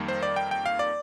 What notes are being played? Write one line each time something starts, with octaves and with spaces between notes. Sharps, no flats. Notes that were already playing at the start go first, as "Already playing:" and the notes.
Already playing: F2 D#3 G3 A#3
C5
D5
G5
G5
F5
D5